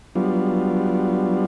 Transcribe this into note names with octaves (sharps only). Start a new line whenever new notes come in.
F#3 G3 B3 D4 F4